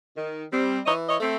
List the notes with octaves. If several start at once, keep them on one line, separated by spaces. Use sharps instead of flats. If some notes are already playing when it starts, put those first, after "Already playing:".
D#3
G3 C4
E3 C#5 D#5
C#5 D#5
A3 C4